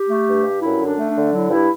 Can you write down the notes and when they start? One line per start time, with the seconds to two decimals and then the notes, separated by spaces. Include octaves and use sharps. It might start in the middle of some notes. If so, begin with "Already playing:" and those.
Already playing: G4
0.08 A3
0.26 G2
0.44 G2
0.61 F#2 E4
0.79 D3
0.85 D4
0.97 A3
1.09 D4
1.15 D3
1.33 F#3 E4
1.50 G2 E4